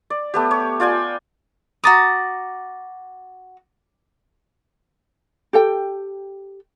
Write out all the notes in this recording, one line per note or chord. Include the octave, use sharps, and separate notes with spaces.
D5
A3 B3 G4
C#5
F4 D5 G5 G#5
F#4 A#5 D6 D#6 A6
G4 A4 G5